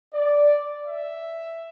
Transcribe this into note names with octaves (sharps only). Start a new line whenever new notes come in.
D5
E5